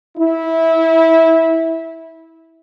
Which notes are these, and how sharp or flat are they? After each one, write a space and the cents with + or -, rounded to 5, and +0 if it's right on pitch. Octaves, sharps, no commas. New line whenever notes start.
E4 -15